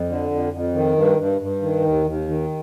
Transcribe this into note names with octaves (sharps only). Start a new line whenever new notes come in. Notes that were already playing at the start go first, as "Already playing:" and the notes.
Already playing: F2
D3
F2
F2
D#3
G2
G2
G2
D#3
D#2
D#2
D#3